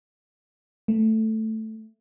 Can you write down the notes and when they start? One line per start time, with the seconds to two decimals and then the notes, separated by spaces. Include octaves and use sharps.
0.88 A3